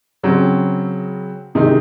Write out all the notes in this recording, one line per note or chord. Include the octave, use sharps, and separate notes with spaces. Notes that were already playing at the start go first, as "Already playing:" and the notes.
C#3 F#3 C4
C3 D#3 G#3 D#4